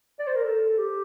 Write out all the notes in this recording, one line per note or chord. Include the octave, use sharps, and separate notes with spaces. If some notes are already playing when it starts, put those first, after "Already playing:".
D5
C5
A#4
A4
G4